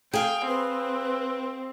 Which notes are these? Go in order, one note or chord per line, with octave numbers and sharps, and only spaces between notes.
G#4 F5 G5
C4 B4